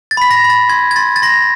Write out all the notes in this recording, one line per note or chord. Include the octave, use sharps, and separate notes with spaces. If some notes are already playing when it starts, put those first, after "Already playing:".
A6
B5 B6
A#6
B5
A6
C6 G#6
G#6
C6 A6
A6
C6 A#6